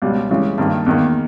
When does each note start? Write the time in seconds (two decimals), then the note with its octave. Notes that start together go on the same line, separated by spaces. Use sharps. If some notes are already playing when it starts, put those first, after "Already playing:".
0.02 C#2 B2 G3
0.29 C#2 C#3 E3 G3
0.58 G2 D#3 A#3
0.86 E2 D#3 A#3